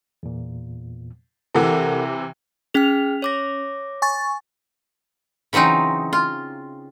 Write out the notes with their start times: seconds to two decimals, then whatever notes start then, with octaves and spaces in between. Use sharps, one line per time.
0.23 E2 A#2
1.55 C3 E3 A4 A#4 F#5
2.74 C#4 G#4 G5 F6 F7
3.22 C#5 D6 A#6
4.02 G#5 C#6 A6
5.53 C#3 E3 F#3 C4 D#4
6.13 F4